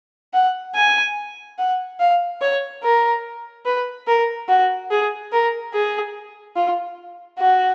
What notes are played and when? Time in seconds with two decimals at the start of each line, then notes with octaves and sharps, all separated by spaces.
0.34 F#5
0.75 G#5
1.58 F#5
2.00 F5
2.41 C#5
2.83 A#4
3.66 B4
4.07 A#4
4.49 F#4
4.91 G#4
5.32 A#4
5.74 G#4
6.56 F4
7.39 F#4